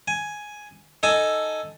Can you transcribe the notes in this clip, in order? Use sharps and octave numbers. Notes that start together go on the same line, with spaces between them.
G#5
D#4 A4 G#5 A5